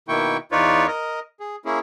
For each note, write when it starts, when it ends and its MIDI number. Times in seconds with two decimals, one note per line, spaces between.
0.08 0.37 47
0.08 0.37 51
0.08 0.37 58
0.08 0.37 64
0.08 0.37 79
0.08 0.37 85
0.52 0.87 40
0.52 0.87 63
0.52 0.87 65
0.52 0.87 71
0.52 0.87 73
0.52 0.87 74
0.87 1.20 70
0.87 1.20 75
1.40 1.56 68
1.65 1.79 58
1.65 1.79 61
1.65 1.79 64
1.65 1.79 68